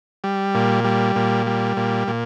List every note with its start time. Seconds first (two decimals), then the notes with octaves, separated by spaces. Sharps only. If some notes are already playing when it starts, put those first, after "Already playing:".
0.24 G3
0.55 A#2
0.84 G3
1.16 A#2
1.47 G3
1.77 A#2
2.08 A#2